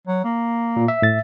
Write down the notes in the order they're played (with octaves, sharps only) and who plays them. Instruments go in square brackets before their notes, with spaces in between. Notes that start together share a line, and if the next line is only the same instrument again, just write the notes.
[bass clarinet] F#3
A#3
[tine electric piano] A#2
E5
[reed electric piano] A2 A6